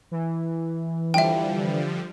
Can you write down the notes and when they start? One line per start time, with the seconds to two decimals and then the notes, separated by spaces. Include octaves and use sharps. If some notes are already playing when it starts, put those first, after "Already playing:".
0.11 E3
1.14 D3 F3 G3 E5 G5